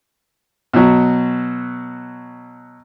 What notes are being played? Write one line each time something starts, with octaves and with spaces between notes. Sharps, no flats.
B2 F#3